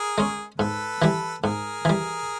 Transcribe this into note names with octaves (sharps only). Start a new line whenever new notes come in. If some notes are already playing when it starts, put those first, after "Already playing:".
Already playing: G#4 A#4
G#3 C#4
G#2 A4 B4
E3 G3
G#2 G#4 A#4
E3 G3